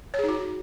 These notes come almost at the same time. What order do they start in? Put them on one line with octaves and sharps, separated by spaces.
C#5 G#4 D#4 F#4